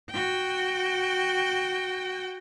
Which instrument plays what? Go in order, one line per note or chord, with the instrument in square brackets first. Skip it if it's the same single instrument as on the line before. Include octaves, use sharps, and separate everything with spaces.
[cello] F#4 G5